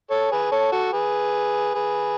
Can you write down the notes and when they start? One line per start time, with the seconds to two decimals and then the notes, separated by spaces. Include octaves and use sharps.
0.10 A4 C#5
0.32 G#4 B4
0.52 A4 C#5
0.72 F#4 A4
0.93 G#4 B4
1.75 G#4 B4